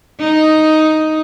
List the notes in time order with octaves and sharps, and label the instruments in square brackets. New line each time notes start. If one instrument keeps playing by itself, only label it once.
[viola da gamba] D#4